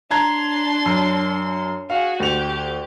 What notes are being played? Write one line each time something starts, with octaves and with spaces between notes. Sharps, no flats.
D4 A5 A#5 C6 G#6
F#2
F#4 G#4 F5
D2 G4 F7